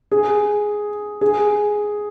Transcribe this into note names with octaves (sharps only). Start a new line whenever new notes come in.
G#4
G#4